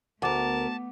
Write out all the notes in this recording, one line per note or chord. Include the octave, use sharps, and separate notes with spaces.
D2 A3 B3 A#4 F#5 A5 D6